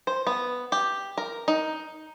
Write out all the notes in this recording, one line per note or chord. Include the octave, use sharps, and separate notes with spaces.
C5
B3
G4
A#4
D#4